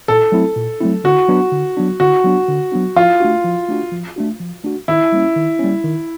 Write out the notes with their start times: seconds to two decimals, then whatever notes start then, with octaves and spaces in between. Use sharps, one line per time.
0.08 A#2 A4
0.32 F#3 A3 C4 E4
0.56 A#2
0.81 F#3 A3 C4 E4
1.04 D3 F#4
1.28 F#3 B3 D4
1.52 D3
1.77 F#3 B3 D4
2.00 D3 F#4
2.24 F#3 B3 D4
2.48 D3
2.72 F#3 B3 D4
2.96 F3 F4
3.20 A3 D4 F#4
3.44 F3
3.68 A3 D4 F#4
3.92 F3
4.16 A3 D4 F#4
4.40 F3
4.64 A3 D4 F#4
4.88 D#3 E4
5.12 G3 A#3 C#4
5.36 D#3
5.59 G3 A#3 C#4
5.84 D#3